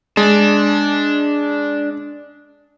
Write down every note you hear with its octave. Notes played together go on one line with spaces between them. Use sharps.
G#3 D4